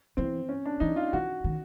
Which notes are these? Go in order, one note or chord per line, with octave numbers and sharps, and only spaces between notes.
E3 C4
C#4
D4
E3 D#4
F4
E3 F#4
D#3